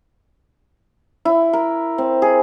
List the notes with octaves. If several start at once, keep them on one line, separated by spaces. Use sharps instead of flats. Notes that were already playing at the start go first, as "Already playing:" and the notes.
E4
A#4
C4
G#4